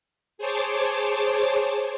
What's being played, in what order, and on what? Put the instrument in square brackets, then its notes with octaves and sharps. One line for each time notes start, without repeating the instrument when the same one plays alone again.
[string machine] G#4 C5 C#5 A5 D6